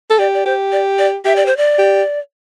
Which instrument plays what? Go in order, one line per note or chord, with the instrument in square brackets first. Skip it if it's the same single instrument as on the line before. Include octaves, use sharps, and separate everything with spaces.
[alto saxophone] A4
[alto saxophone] G4 [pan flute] D5
[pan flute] D5
[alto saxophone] G4 [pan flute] C5
[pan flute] D5
D5
[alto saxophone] G4 [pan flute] E5
[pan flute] D5
C5
D5
[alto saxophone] G4